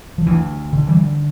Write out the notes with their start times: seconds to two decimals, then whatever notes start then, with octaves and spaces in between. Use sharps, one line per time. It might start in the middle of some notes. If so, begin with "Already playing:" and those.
0.18 F3
0.27 D2 E3
0.73 D3
0.87 E3 G3